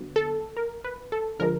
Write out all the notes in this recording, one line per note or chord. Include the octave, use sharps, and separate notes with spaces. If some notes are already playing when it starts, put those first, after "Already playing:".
Already playing: D3 F#3 B3
A4
A#4
B4
A4
D3 F3 G#3 A#4